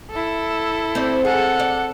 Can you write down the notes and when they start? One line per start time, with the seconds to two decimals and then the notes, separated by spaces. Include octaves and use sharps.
0.11 E4 A4
0.95 C4 D5
1.25 G#4 A4 F#5
1.60 D5